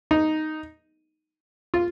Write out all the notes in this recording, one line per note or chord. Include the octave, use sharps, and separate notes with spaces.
D#4
F4